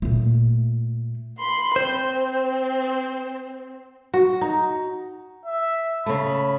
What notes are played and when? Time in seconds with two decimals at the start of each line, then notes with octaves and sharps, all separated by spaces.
0.02 A#2 A3
1.38 B5 C6
1.76 C4 C5
4.14 F#4
4.41 D#4
5.45 E5
6.06 C#3 A3 B5